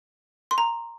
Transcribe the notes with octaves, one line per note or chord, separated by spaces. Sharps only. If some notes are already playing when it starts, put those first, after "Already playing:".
C6
A#5